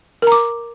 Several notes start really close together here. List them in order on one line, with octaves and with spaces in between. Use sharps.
A#4 A#5 D6